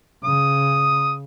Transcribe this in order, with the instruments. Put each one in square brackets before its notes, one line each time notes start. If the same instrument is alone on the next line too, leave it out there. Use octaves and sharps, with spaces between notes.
[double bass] C#3 [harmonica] D#6